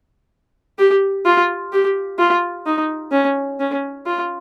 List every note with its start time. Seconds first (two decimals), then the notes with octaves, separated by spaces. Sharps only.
0.79 G4
1.26 F4
1.72 G4
2.19 F4
2.66 D#4
3.12 C#4
3.60 C#4
4.06 F4